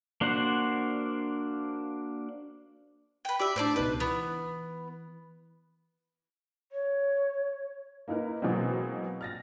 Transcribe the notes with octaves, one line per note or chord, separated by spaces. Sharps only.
A#3 D4 F#4 C5 F#5
B4 G5
G4 D5 E5 B5
A2 D4 C5 D5 A5
C#2 B2 D#4 B4
E3 B3
C#5
A#3 D#4 E4 A#4 B4
B2 E3 F#3 G#3 A#3 C4
F6 A6 A#6